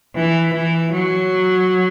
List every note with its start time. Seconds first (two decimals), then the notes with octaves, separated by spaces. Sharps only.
0.15 E3
0.54 E3
0.93 F#3